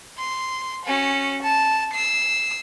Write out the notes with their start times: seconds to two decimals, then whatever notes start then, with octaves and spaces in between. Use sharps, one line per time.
0.18 C6
0.86 C#4 F#4
1.42 A5
1.94 E6 C7